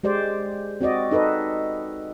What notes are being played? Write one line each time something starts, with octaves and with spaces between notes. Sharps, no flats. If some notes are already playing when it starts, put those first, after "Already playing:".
G#3 G4 C5 D5
C4 F#4 D5 D#5
D#4 A4 B4 D#5